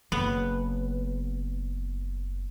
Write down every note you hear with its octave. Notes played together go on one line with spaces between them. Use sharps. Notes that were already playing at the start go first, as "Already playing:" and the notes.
F#1 C#3 B3